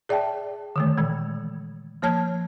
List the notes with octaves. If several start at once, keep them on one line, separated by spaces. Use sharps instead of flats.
G#4 D5 E5 G5 A5
D3 D#3 A3
A#2 E3 G#3
F3 A#3 C#5 A5 F6 G#6